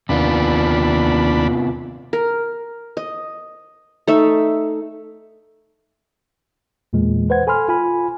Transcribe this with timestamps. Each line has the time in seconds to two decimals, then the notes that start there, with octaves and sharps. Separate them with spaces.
0.09 D#2 C3 B3 D4 F4 B5
2.13 A#4
2.97 D#5
4.07 A3 D#4 E5
6.93 E2 A#2 E3 G#3
7.30 B4 C5 F#5 G#6
7.47 A4 G#5 B5 C6 F6
7.68 F4 G#5 B5